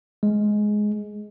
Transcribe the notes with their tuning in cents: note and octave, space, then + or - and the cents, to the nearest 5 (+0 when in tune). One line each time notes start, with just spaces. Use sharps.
G#3 +10